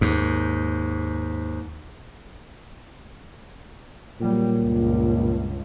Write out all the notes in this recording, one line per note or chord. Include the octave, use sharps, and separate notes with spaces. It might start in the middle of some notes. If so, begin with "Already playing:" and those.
D#2 G#2
A#2 F#3 G3
C#2 G2